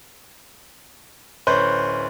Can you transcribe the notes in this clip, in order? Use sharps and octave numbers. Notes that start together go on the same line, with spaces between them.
D1 C#4 B4 C5 F#6 G6